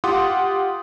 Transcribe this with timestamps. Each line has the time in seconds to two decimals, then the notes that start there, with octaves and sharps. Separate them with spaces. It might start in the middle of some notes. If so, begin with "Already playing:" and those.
0.04 F4 G4 F#5 C6 D6 D#6